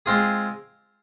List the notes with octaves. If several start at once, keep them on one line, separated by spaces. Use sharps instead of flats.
G#3 C4 F4 G#4